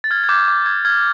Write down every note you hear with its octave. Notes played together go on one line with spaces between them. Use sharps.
A6
F6 G#6
G#6
D6 G6
D6
F6 G#6
F6 G#6